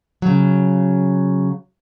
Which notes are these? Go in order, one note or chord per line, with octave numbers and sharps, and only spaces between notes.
C#3 F#3